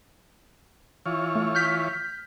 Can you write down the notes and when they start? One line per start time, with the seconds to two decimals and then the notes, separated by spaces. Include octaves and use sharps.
1.06 E3 F4 C#5
1.35 A3
1.55 F6 G6 B6